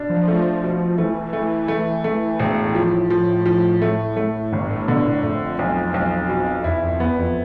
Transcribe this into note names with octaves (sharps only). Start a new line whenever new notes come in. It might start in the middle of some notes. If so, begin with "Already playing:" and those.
Already playing: B2 D4
F3
A3
B2
E3 A3
A3
A3
A3
E1 A2
F3
F3
F3
A3
A3
G1 G2
A2
B2 D3
A2
F2 A3
B1
B1
B2
E2 E4
F2
F2
E2 B3
F2